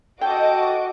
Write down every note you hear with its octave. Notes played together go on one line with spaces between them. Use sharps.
F#4 A4 D#5 G5 D6